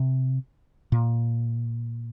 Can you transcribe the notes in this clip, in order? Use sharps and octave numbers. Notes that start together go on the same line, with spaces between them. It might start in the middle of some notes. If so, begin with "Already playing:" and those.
Already playing: C3
A#2